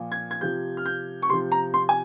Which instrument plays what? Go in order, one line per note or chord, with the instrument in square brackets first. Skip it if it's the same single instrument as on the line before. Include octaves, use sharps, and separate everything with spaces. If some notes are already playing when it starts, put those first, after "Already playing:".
Already playing: [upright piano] A#2 F3
G#6
G#6
C3 F3 G6
F6
G6
C#6
C3 C6
F3
A#5
C6
G#5